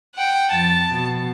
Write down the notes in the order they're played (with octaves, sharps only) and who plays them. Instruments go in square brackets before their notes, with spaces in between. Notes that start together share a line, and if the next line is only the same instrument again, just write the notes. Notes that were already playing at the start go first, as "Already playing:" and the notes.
[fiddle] F#5 G5
[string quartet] F2 A6 [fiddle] A5
[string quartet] B2